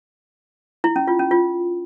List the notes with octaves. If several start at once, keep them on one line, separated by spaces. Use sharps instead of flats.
E4
C#4
F4
C#4
F4